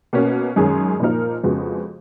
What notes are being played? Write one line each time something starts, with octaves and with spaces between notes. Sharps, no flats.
B2 A#3 C#4
F#2 D#3 G#3 C#4 G#4
A#2 F3 A#3 D#4 A#4
F2 C#3 G#3 B3 F#4